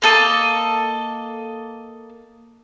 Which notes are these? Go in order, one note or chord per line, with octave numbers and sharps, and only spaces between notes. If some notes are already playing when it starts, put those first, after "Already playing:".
A#3 A4 D#5